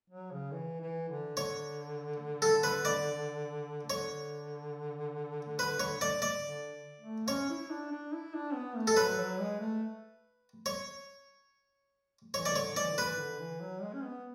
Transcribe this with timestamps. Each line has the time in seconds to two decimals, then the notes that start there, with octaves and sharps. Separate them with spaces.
0.10 F#3
0.31 C#3
0.52 E3
0.80 E3
1.09 D3
1.37 D3 C#5
2.42 A4
2.63 B4
2.85 D5
3.90 D3 C#5
5.59 B4
5.80 C#5
6.01 D5
6.22 D5
6.43 D3
7.00 A3
7.28 C#4 C#5
7.49 E4
7.70 D4
7.91 D4
8.12 E4
8.34 D4
8.54 B3
8.76 A3
8.87 A4
8.96 F#3 B4
9.17 F#3
9.38 G#3
9.60 A3
10.66 C#5
12.34 E3 C#5
12.45 D5
12.52 C#3
12.55 D3 C#5
12.76 E3 D5
12.92 D3
12.97 E3 B4
13.18 D3
13.40 E3
13.60 F#3
13.82 G#3
13.93 C#4
14.04 B3